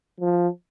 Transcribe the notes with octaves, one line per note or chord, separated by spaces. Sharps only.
F3